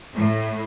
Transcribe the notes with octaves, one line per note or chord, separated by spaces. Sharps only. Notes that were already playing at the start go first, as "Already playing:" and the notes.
A2